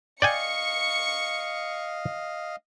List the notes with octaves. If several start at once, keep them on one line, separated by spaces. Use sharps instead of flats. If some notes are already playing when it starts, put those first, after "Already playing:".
D5 D#5 F5 G5 G#5 C#6 C#7